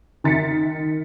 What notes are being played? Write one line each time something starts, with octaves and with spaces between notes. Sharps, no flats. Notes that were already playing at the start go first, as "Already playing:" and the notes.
D#3 A6 B6 C#7